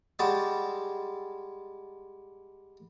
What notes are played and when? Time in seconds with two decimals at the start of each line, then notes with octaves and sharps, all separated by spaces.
0.19 G3 G#3 F#4 A5 D#6